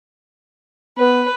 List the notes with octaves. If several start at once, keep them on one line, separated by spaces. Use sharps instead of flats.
B3 B4